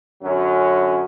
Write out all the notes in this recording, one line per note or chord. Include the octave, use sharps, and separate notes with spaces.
F#2 D3 F#3 C#4